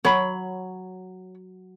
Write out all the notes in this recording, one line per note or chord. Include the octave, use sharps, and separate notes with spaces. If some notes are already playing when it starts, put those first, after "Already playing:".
F#3 C#5 B5